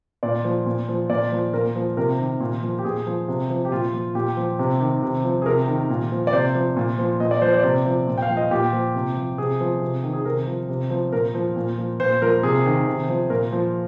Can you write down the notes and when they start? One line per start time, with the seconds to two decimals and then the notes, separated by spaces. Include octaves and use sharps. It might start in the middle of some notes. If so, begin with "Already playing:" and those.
0.23 A#2 D5
0.44 F3
0.66 A#2
0.89 F3
1.10 A#2 D5
1.32 F3
1.54 A#2 A#4
1.76 F3
1.97 C3 A#4
2.19 D#3
2.40 A#2
2.63 F3
2.79 G4
2.85 A#2 G#4
3.07 F3
3.28 C3
3.50 F3
3.65 G4
3.72 A#2 F4
3.93 F3
4.15 A#2 G4
4.37 F3
4.59 C3
4.80 D#3
5.03 C3
5.24 F3
5.42 G#4
5.46 C3 A#4
5.68 D#3
5.90 A#2
6.12 F3
6.27 D5
6.33 C3 C5
6.55 F3
6.76 A#2
6.99 F3
7.20 A#2 D#5
7.31 D5
7.42 F3 C5
7.53 D5
7.63 C3
7.86 F3
8.07 A#2
8.18 G5
8.22 F5
8.29 F3
8.37 D#5
8.51 A#2 G4
8.73 F3
8.95 C3
9.17 F3
9.38 C3 G#4
9.61 F3
9.82 C3
10.04 D#3
10.13 G#4
10.25 C3 A#4
10.47 F3
10.69 C3
10.90 F3
11.12 A#2 A#4
11.35 F3
11.56 A#2
11.78 F3
12.00 A#2 C5
12.22 F3 A#4
12.43 C3 G#4
12.66 D#3
12.87 C3
13.09 F3
13.30 A#2 A#4
13.52 F3